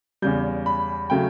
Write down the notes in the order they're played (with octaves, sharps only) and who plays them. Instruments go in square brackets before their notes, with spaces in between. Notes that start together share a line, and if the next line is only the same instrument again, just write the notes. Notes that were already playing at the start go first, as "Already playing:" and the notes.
[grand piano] E2 C#3 G3 G6
B5
C#3 F#3 A3 G5